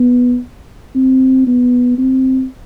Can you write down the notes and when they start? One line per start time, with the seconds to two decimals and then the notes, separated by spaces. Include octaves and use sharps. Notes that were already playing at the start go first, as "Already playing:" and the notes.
Already playing: B3
0.95 C4
1.47 B3
1.98 C4